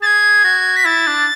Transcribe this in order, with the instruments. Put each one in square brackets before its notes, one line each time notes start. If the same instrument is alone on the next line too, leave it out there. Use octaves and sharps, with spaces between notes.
[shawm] G#4 [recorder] A6
[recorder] G#6
[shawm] F#4
[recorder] B6
[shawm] E4 [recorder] A6
[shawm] D4